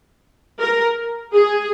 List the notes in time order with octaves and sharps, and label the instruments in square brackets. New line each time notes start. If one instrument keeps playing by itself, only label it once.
[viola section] A#4
G#4